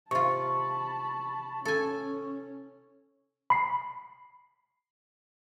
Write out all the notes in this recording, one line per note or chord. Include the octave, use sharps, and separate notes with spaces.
C3 F4 A5 B5 C#6
C#4 A4 G#5
B5 C7